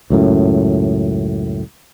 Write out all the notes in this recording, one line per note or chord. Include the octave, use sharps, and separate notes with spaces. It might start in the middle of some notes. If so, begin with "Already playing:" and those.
C#2 F#2 A2